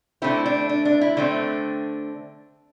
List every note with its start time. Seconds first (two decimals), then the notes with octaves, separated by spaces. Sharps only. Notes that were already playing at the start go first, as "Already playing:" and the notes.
0.22 D3 A3 C4 E4
0.46 D4
0.69 D4
0.85 D4
1.01 E4
1.17 D3 A3 C4 D4